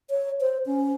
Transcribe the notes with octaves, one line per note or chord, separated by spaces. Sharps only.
C#5
C5
C#4